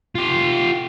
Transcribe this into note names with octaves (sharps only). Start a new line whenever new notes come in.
F4 G4